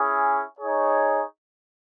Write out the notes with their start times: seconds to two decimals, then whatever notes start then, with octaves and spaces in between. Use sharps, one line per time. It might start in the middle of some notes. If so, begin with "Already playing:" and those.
Already playing: C#4 E4 G#4
0.59 D#4 G#4 C#5